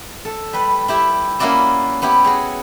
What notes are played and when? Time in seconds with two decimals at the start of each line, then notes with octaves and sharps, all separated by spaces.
0.25 A4
0.53 G3 B4
0.88 E4 G4 E5
1.39 A#3 C#4 E4 F#4 D5 E5
2.02 B3 E4 G4
2.24 F#4 G#4 C#5